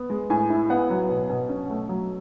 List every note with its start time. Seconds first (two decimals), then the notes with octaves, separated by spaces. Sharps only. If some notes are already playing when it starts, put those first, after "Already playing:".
Already playing: B3
0.10 G#3
0.30 A2 G#5
0.50 E4
0.70 B3 F#5
0.90 F#3
1.09 B2
1.30 B2
1.49 C#4
1.70 A3
1.89 F#3